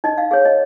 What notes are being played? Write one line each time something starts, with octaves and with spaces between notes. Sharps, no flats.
D#4 D#5
F5
G#4 C#5 F5
D#5